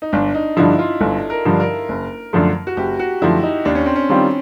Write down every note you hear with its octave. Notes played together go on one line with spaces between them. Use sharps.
D#4
G1 D4
D#4
G2 D3 F3 E4
F4
G1 A4
A#4
G2 D3 F3
A#4
F#1
F#2 D3 F3 A3
F#4
F#1 G4
F#4
F#2 D3 F3 A3 E4
D#4
D#2 D4
C#4
C4
C#4
D#3 G3 C4 F4